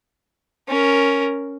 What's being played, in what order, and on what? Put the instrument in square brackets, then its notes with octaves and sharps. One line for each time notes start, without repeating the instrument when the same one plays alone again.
[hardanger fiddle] C#4 A#4